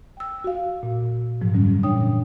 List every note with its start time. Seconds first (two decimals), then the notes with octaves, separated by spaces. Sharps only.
0.17 G5 E6
0.44 F#4 F5
0.83 A#2
1.41 G#2 F3 F#3
1.54 F#2 D3 F#3 G3 C#4
1.83 A#2 E3 D4 C#5 G5 D#6